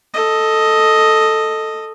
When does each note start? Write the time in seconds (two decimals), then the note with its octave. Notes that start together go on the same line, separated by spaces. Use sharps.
0.14 A4 D#5